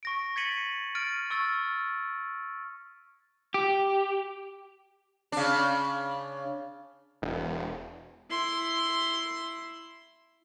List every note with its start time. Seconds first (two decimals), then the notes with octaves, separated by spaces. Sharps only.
0.03 C#6 A#6 D7
0.36 G#6 A6 B6 C#7 D#7 F#7
0.95 F6 A6 D7 D#7
1.30 C#6 E6 F6 A6
3.54 G4
5.32 C#3 D4
7.22 E1
8.30 E4 C6